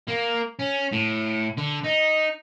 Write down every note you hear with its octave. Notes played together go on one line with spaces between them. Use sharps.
A#3
C#4
A2
D3
D#4